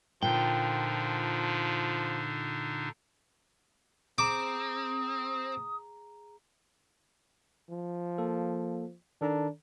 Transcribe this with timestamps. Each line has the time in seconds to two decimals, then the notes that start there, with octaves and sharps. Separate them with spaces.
0.22 A#2 D3 F3 D4 D#4 G5
4.18 C4 G#4 A#5 D6 D#6
7.70 F3
8.18 A#3 A4
9.21 D#3 D4 A4 A#5